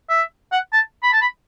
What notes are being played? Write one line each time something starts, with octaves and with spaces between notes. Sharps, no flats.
E5
F#5
A5
B5
A5
B5